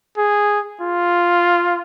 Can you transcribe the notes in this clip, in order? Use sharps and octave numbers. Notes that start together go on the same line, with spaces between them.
G#4
F4